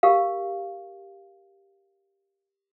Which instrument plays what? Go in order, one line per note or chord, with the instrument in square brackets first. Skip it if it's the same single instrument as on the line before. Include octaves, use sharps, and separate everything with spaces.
[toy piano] G4 A#4 F5